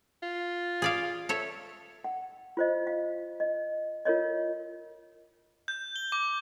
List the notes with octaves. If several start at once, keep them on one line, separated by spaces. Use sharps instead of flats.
F4
G#4 D5 F5
A4 C#5 E5
F#5
F4 C5 D#5
F5
D#5
F4 A#4 C#5 D#5
G6
G7
D6